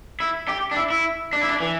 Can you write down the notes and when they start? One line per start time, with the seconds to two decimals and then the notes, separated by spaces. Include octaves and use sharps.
0.20 E4
0.48 G4
0.71 D4
0.76 E4
0.90 E4
1.33 D4
1.41 E4
1.49 D4
1.60 E3